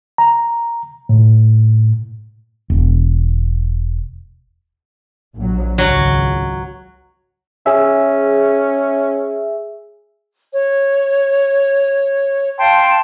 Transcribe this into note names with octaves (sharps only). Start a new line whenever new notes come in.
A#5
A2
E1
A#1 F#3
G#1 C#2 F#3
C#4 G#4 E5
C#5
F5 G5 A5 C6